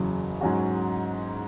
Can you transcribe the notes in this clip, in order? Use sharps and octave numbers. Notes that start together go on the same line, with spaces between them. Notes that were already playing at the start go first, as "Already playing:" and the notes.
Already playing: F#1 E2 C#3 F#3
G#2 F#3 C#4 F#4